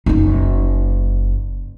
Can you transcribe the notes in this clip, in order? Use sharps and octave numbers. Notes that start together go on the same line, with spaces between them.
F#1 D#4